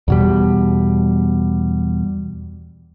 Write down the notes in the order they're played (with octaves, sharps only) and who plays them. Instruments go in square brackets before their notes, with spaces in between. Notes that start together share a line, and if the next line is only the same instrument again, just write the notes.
[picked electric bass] E2 B2 G3